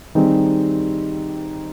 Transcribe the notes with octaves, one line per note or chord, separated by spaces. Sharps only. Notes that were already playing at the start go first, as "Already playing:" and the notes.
D#3 G3 C4 D#4 G#4